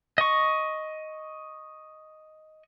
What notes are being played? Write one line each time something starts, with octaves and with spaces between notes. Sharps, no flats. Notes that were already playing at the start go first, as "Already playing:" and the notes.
D#5 C#6